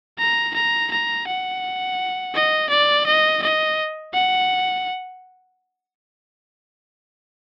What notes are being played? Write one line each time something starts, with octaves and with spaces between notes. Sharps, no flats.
A#5
A#5
A#5
F#5
D#5
D5
D#5
D#5
F#5